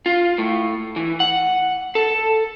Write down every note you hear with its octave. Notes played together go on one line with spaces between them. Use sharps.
F4
A2
E3
F#5
A4